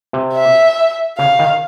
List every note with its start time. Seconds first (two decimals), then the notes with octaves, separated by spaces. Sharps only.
0.13 C3
0.34 E5
1.18 C#3 F5
1.39 D#3